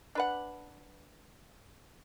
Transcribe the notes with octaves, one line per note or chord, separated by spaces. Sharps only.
D4 B4 F#5